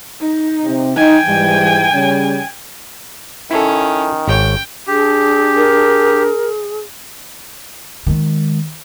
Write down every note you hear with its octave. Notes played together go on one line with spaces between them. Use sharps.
D#4
C3
D#4 G5 G#5
G#2 E3 G3
C#3 G3 C#4
D#3 C#4 E4 A4
G#1 C#5 G5
D4 G4 G#4
A#4
D#3 G#3